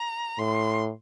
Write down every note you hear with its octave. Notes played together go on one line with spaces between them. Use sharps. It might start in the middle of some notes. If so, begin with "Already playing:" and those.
Already playing: A#5
A2 C6